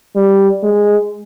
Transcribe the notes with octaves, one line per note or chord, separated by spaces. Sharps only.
G3
G#3